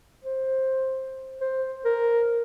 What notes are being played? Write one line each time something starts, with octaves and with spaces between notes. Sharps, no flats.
C5
C5
A#4